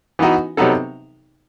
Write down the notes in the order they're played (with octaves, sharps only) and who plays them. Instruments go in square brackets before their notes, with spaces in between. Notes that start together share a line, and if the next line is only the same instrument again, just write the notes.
[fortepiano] E3 B3 D#4 F#4
C3 F#3 B3 D#4 A4